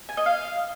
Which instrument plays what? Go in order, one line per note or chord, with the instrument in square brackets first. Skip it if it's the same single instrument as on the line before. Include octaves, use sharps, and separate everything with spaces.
[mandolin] G#5
D#5
F5